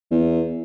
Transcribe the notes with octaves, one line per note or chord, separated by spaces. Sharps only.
E2